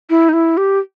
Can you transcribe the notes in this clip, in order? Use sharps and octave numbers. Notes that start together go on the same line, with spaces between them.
E4
D#4
E4
G4